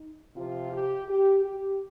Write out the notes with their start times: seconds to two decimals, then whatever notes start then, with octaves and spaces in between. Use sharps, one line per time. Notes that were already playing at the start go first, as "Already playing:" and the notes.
Already playing: D#4
0.36 C3 F3 F4
0.73 G4
1.09 G4
1.45 G4